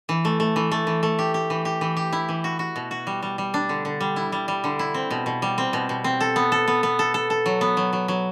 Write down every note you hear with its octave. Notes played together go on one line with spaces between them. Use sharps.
E3
A3
A3
E3
A3
E3
A3
G4
G4
E3
G4
E3
G4
E4
E3
F#4
F#4
B2
F#4
G3
G3
G3
D4
D3
D3
G3
E4
G3
G3
D3
E4
C4
B2
B2
G3
C4
B2
B2
C4
A4
B3
A4
B3
B3
A4
A4
A4
F#3
B3
F#3
F#3
F#3